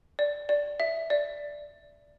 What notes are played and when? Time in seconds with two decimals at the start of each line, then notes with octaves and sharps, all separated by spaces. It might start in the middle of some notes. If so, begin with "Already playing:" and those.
0.19 D5
0.49 D5
0.80 E5
1.10 D5